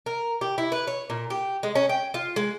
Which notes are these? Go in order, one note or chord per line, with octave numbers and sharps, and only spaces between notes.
A#4
G4
E4
B4
C#5
A#2
G4
G#3
C#4
G5
F4
G#3